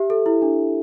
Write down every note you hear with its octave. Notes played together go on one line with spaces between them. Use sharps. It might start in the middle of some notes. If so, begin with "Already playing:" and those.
Already playing: G4 E5
A4
E4
D4